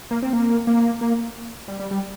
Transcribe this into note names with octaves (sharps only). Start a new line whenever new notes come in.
A#3
C4
A#3
A#3
A#3
G3
G3
G3